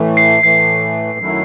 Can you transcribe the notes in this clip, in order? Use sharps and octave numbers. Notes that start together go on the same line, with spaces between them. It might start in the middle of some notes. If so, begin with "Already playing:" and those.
Already playing: A2 E3 A3
C7
A2 E3 A3 C7
F#2 D#3 F#3 A3 E4